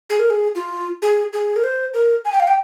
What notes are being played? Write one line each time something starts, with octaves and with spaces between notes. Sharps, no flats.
G#4
A#4
G#4
F4
G#4
G#4
A#4
C5
A#4
G#5
G5
F5
G5